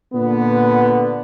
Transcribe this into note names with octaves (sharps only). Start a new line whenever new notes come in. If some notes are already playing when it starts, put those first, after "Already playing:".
A#2 D3 B3